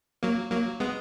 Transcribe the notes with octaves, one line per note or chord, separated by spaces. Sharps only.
F#3 A#3
F#3 A#3
G#3 B3